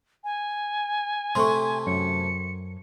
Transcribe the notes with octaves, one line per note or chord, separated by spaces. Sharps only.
G#5
C3 A3 C6 C#6
F#2 C#7